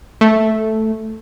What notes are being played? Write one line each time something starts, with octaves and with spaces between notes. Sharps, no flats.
A3